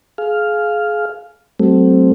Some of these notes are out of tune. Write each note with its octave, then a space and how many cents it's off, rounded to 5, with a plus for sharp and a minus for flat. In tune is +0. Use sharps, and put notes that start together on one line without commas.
G#4 +25 F5 +0
F#3 +40 A3 +0 C4 +0